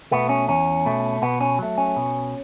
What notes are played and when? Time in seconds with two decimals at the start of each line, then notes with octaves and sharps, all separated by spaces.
0.12 B2 A3 B3
0.29 C#4
0.48 E2 C#4
0.86 B2 A3
1.22 B2 B3
1.41 C#4
1.59 F#3 A3
1.78 C#4
1.97 B2